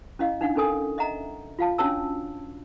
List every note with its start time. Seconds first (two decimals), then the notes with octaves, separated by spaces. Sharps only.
0.19 C#4 E4 D#5 F5
0.41 D4 D#4 F5 F#5
0.55 C#4 D#4 A4 A#4 G#5 D#6
0.98 D#5 E5 F#5 A#5
1.59 F4 F5 A5
1.78 C#4 D4 F#4 C#5 A5 E6